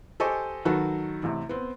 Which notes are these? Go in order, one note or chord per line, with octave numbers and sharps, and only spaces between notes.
G4 A4 C5 D#5 G#5 C#6
D#3 F#3 F#4 A4 B4
A1 C3
B3 C4